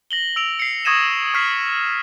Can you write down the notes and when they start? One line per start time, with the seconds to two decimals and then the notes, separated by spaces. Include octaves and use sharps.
0.11 A#6 F#7 G7
0.36 E6 D7 F7
0.59 C7 C#7
0.85 C#6 D#6 G#6 A#6 D#7 E7
1.34 C#6 D#6 F6 G#6 B6 C7